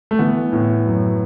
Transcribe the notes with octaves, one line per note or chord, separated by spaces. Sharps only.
A3
E3 B3
A2
F#2